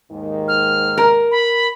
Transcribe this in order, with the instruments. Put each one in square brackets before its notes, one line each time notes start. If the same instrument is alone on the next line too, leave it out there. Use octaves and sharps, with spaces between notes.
[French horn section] D#2 G#2 D#3
[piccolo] F6
[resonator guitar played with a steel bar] A#4
[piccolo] B5